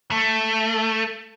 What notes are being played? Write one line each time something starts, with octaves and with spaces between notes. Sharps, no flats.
A3